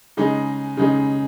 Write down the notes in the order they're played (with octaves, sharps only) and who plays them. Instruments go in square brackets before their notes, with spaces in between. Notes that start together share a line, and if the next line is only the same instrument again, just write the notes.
[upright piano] C#3 G#3 D#4 G#4
C#3 G#3 D#4 G#4